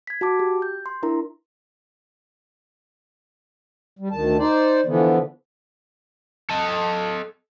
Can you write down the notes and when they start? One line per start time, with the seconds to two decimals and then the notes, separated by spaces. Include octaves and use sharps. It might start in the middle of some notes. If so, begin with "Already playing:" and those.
0.07 G#6 B6
0.21 F#4 A5 D6
0.40 G4
0.62 G6
0.86 C6
1.03 D4 E4 A#4 A#5
3.99 G3
4.12 D2 D#3 A5
4.39 D#4 C5 D5
4.86 D3 E3 F3 B3
6.49 A4 D#5